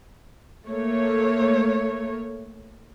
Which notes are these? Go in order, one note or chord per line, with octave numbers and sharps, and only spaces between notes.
A3 A#3 C#5